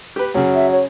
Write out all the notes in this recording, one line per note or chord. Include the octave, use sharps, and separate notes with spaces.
G4 B4
F#2 C#3 F#3
E5
C#5